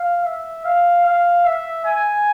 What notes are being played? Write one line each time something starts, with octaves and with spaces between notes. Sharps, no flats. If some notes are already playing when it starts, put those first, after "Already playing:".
Already playing: F5
E5
F5
F5
E5
G#5